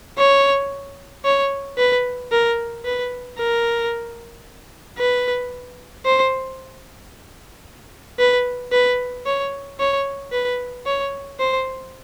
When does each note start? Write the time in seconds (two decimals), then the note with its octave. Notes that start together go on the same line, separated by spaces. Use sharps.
0.18 C#5
1.25 C#5
1.78 B4
2.32 A#4
2.85 B4
3.39 A#4
4.98 B4
6.06 C5
8.19 B4
8.72 B4
9.26 C#5
9.80 C#5
10.32 B4
10.86 C#5
11.40 C5